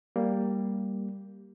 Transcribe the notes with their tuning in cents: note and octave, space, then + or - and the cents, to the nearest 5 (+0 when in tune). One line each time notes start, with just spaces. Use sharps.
G3 +0 A#3 +0